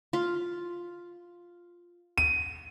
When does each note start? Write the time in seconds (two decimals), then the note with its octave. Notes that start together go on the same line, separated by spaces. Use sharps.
0.13 F4
2.18 D#7